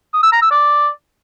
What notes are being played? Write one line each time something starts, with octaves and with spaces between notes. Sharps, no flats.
D#6
E6
A#5
E6
D5